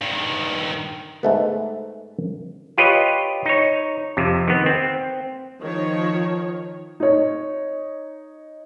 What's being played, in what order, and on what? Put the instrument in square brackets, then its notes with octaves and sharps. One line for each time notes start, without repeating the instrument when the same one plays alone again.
[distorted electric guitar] G2 D#3
[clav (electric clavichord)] G#2 A3 B3
F4 G4 B4 C#5 D#5
D#4 C#5
F2 C3
D#3 B3
C4
[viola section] D#3 F3 C#5
[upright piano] D#4 C#5